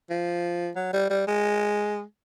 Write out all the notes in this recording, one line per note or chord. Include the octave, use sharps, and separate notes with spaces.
F3
F#3
G3
G3
G#3